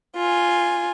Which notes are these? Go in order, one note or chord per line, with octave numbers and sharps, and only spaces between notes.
F4 G#5